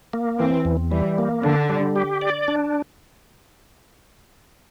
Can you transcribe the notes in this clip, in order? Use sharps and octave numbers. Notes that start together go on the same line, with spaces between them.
A#3
E3 C4
E2
E3 G3
A#3
D3 D4
G3
G4
D5
D4